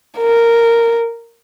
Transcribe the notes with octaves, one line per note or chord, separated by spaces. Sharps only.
A#4